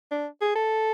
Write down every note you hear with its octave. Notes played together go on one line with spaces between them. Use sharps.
D4
G#4
A4